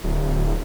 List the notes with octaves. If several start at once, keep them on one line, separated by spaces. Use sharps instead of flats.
D1